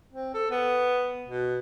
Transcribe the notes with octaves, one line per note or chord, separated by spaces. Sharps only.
C4
A4
B3
B2